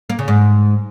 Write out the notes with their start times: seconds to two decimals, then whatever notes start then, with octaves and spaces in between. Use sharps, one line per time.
0.10 A#3
0.19 C#3
0.28 G#2